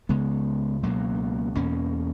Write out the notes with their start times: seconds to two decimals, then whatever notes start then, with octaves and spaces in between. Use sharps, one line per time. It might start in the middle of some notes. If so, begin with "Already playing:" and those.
0.09 C#2 C#3 G#3 B3
0.83 C#2 B2 F#3 A#3
1.57 E2 B2 A#3 C#4